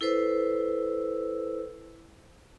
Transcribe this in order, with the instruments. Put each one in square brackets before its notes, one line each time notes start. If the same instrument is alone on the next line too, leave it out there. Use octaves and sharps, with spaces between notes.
[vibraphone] E4 A4 B4 C5 E6